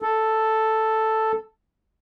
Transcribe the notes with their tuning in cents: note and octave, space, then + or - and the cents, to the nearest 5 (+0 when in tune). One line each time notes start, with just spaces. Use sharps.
A4 +0